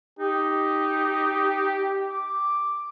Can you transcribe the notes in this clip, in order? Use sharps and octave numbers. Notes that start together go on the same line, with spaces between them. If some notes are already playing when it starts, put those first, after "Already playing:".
D#4 G4
D6